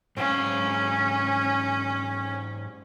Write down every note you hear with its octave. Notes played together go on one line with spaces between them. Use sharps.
G#2 F#3 C#4 F5